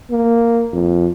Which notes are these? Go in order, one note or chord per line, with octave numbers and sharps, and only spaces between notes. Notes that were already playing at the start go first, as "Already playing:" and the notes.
A#3
F2